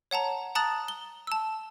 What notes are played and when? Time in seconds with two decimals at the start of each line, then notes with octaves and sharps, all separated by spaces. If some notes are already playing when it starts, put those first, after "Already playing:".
0.11 C#5 F#5 A5 A#5
0.55 A5 A#5 D#6 F#6 A6 F#7
0.88 G7
1.27 A5 E6